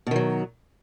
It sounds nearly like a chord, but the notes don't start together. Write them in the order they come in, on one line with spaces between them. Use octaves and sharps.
B2 D#3 F#3